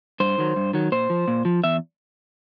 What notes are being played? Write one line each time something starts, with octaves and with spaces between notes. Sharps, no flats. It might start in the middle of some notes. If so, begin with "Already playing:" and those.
G2 C5
D#3 F#3
G2
D#3 F#3
A#2 C5
F3
A#2
F3
E2 E5